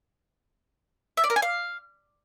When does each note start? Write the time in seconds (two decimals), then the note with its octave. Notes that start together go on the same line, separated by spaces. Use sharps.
1.17 E5
1.24 D5
1.30 A#4
1.36 G#5
1.42 F5